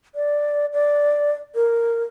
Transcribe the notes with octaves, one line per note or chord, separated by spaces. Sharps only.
D5
D5
A#4